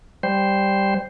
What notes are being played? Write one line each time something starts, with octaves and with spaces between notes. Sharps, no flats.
G3 C5